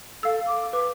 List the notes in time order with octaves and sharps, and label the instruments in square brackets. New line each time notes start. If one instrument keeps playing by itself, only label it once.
[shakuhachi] A4 [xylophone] F5 E6
[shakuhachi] D6
[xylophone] B4 [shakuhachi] D6